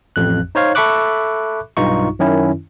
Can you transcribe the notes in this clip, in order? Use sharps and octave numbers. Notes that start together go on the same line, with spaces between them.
A1 F2 F#6
D#4 C5 C#5 F5
A4 E5 B5 C#6 D6 F#6
B1 G2 D#4 F4 C#6
F#2 D#3 C#4 E4